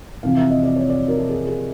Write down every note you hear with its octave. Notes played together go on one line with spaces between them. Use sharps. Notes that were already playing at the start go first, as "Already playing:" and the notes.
F2 C3 E3 F5
E5
D#5
D5
C#5
D5
A#4
A4
G#4
G#4